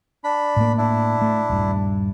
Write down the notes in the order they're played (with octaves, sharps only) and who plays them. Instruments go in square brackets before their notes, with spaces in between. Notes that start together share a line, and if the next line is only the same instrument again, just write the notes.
[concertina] D4 B5
[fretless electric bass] A2 A#3
[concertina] D4 E4
[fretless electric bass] A3
D#1 G2